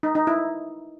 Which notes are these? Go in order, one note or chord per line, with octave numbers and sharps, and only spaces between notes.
D#4
D#4
E4